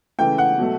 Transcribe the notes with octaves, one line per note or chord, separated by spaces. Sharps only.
C#3 E3 A3 G5
F#5
B2 F#3 A3